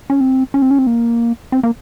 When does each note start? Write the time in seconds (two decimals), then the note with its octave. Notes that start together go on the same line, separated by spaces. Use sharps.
0.10 C#4
0.21 C4
0.54 C#4
0.62 C4
0.71 C#4
0.79 C4
0.87 A#3
1.52 C4
1.63 A#3